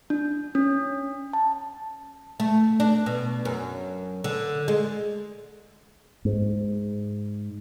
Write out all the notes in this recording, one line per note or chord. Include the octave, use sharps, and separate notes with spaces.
D4
C#4
A5
A3
D4
B2
F#2
D3
G#3
G#2